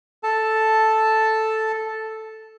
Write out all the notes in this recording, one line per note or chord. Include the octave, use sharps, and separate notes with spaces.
A4 A5